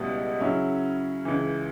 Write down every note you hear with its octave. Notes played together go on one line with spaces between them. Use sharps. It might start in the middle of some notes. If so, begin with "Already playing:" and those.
Already playing: C#2 B2 G3 B3 E4
C#3 F#3 C#4 E4
C#2 C#3 E3